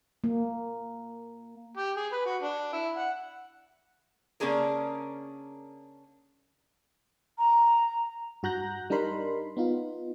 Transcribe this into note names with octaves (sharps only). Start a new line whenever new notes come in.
A#3
G4
G#4
B4
F#4
D4
E4
F#5
C#3 A#3 C#4 D4 G#4 A#4
A#5
G2 F#4 A#5 F#6 G6 A#6
G3 D4 D#4 A#4 B5 C6
B3 D#4 F4